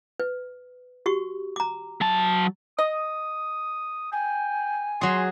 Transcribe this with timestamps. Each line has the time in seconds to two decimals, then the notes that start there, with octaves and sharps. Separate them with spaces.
0.20 B4
1.06 F#4 G4 C#6
1.56 A#5 D6
2.01 F#3 A5
2.78 D#5 D#6
4.12 G5 G#5
5.01 F#3 G#4 C6